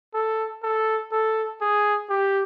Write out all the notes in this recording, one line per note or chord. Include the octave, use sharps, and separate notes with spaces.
A4
A4
A4
G#4
G4